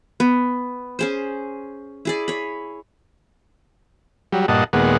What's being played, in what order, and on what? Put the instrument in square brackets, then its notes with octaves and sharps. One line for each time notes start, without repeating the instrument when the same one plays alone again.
[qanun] B3
C#4 G#4 C5
E4 G#4 D5
C#5 B5
[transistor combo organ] F#3 G3
G2 A#2 D#5 F#5 A5
D#2 A#2 G#3 B3 F#5